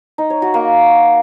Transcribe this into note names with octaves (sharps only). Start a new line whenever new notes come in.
D#4
C#5
F#4
A#3